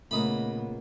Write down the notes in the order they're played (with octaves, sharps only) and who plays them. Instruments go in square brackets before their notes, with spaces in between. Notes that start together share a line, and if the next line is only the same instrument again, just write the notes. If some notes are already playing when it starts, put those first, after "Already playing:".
[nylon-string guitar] A#2 D#5 [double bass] C#3 B3 [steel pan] A3 [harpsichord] B5 D#6